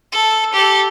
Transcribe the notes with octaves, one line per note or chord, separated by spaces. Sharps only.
A4
G4 A4